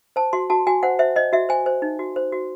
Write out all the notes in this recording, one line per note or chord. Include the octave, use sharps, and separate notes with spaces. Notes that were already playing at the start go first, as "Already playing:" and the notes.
C5 A5
F#4 C6
F#4 A5
F#4 G#5
C5 F#5
C5 E5
C5 D#5
F#4 E5
C5 G#5
C5
D#4
F#4
C5
F#4